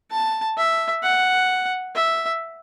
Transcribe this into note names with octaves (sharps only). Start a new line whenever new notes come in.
A5
E5
F#5
E5